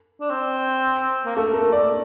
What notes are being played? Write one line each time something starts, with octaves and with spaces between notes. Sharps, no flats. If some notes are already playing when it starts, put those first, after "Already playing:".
D4
C4
A#3
A3 A4
A#4
D5